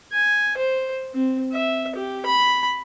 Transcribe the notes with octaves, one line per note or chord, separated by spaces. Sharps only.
G#5
C5
C4
E5
G4
B5